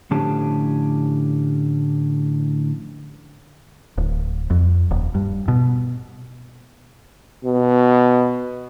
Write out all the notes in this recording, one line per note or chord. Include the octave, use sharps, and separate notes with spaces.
A2 D3 F3 C#4 G4 A5
D1
F2
D#1
G2
B2
B2